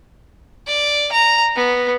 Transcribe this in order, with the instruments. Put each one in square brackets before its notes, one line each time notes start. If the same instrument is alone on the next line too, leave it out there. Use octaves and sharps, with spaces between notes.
[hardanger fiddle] D5
A#5
B3